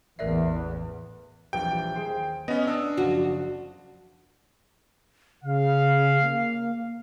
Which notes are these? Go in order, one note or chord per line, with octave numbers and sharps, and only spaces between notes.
A1 E2 A#4 D5 E5
A#1 E3 G3 G5
D#2 G#4 C5
B3 C#4 D#5
D4 D#6 E6
F#1 F3 F#4 D5
C#3 F5
A#3